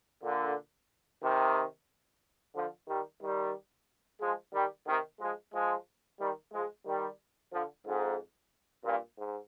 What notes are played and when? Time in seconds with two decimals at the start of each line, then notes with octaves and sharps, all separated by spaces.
0.24 A#2 D3
1.23 C3 D#3
2.56 D3 F3
2.89 D#3 G3
3.22 D#3 G3
4.21 F3 G#3
4.54 D#3 G3
4.87 C3 D#3
5.20 F3 G#3
5.54 F3 G#3
6.20 D#3 G3
6.53 F3 G#3
6.86 D#3 G3
7.52 D3 F3
7.86 F2 G#2
8.85 G2 A#2
9.17 G#2